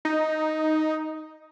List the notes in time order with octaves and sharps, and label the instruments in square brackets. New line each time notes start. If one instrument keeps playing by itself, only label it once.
[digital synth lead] D#4